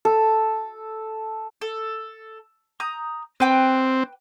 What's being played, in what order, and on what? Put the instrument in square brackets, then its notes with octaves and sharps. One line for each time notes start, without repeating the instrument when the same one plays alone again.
[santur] A4
[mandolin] A4
A#5 D#6 G6
[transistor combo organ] C4 [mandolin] B4 G5 D6